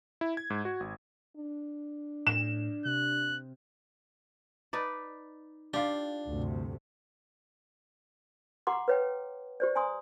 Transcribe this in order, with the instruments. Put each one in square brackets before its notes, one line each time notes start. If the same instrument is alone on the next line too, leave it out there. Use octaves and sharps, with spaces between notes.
[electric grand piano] E4
G#6
G#2
F#4
G#1
[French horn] D4
[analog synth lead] A2 [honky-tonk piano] E7
[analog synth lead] C3 [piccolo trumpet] F#6
[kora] D#4 B4 D5
[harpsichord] D4 [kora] F4 G4
[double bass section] D2 G2 C3
[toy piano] G4 F#5 A#5 C6 D6
B4 C#5 G5
G4 C5 D5
G#5 A#5 C6 D#6